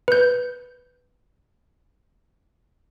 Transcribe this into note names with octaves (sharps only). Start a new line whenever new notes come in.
B4 G6